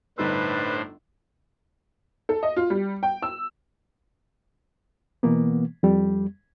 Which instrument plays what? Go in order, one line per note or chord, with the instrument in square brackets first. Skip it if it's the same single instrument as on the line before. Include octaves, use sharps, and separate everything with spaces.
[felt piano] G1 D#4 E6 [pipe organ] A2 D4 C5 [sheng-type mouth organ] B4
[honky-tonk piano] A4
D#5
F4
G3
G5
E6
[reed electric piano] B2 E3 A#3 B3
F2 G3